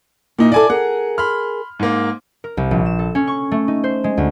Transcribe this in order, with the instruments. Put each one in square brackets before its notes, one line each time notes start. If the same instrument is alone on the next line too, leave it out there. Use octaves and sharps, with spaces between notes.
[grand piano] A#2 D#4 [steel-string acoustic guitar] A#3 E4
[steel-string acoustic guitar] E4 A4 [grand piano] D5 G#5 D6
[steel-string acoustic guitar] G#4 A#4 [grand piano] F#5
[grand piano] B5 C6 F6
G#2 A#3
[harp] A#4
C2
A#1
E7
A4
C#4
C#6
A3
D#4
C5
G#3
D2